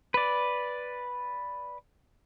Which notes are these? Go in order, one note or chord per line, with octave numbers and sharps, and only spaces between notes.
B4 D5